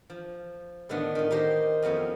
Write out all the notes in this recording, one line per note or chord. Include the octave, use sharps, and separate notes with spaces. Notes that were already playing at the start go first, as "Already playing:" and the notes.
F3
A2 D3 D#3 A3 B3
D#3 F4
D#4 G4 C5 A#5
F2 F3 B3 C#4 E4